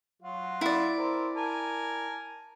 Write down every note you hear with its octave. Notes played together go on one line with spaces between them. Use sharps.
F#3 F4 F#4
E4 D5
C4 A#4
A#4 G#5 A5